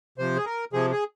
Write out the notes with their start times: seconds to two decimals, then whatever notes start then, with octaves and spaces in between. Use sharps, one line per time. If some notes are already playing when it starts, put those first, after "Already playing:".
0.18 C3 F3 C5
0.37 G#4
0.46 A#4
0.73 C3 F3 G#4
0.91 G#4